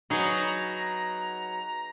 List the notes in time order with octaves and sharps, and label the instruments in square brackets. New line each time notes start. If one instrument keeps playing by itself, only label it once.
[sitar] F#3 B3 [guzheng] D#4 G#4 [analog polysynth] A#5